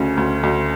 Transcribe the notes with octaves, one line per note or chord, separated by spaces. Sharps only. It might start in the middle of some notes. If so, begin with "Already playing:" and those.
Already playing: D2 C#3
D2
D2